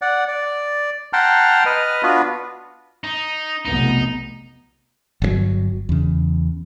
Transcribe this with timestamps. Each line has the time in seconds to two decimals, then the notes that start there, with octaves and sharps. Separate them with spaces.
0.02 D5 F#5
0.28 D5
1.13 F#5 G5 A5 A#5 C6 F6
1.66 B4 D#5 F6
2.03 B3 D4 F4 F#4 B4
3.04 D#4
3.65 F1 B1 B3 D#4
5.22 G1 C3 F#3
5.89 E2 C#3